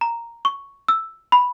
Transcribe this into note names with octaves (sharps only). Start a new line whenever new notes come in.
A#5
C#6
E6
B5